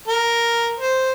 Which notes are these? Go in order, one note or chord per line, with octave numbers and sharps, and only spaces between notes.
A#4
C5